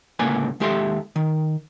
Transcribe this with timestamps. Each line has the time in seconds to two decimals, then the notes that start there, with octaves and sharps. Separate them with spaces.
0.19 C#2 A2 D3 A#3 B4 G#5
0.60 D#2 G#3 G4 A4 E5 C6
1.16 D#3